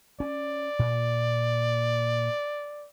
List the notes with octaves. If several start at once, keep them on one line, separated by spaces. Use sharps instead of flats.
C#4 D5
A#2